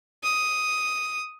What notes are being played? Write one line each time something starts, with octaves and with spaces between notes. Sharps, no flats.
D#6